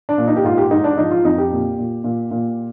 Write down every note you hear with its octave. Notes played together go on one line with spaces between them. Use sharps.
D4
A#2
D#4
G4
G#2 F4
G4
G#2 D#4
D4
F3 D#4
F4
F2 D#4
G4
A#2
A#2
A#2
A#2